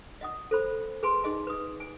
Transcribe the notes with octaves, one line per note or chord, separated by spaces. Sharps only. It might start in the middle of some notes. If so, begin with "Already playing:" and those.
D#5 F#5 D#6
A4 C5 B5
G#4 B4 G#5 C6
D#4 G#4 D#5 G#5
B4 D#6
G#5